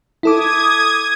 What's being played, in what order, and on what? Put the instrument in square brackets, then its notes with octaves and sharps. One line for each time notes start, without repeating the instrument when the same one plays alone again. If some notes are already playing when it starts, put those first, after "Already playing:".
[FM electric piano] E4 A4 D6 [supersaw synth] D#6 G#6